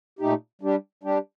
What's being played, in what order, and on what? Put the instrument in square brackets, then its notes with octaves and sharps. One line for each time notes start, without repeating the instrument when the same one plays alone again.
[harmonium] A#2 A3 D#4 G4
G3 D4 G4
G3 D4 G4